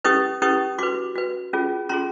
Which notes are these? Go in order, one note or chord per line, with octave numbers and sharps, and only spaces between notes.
C#4 E4 G4 B4 C#6 D#6
C#4 E4 G4 B4 C#6 D#6
F#4 B4 C6 D6
F#4 B4
C#4 F4 G#4
C#4 F4 G#4 A#5 C6